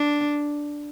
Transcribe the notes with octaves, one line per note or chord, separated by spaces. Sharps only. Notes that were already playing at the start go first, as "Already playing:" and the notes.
Already playing: D4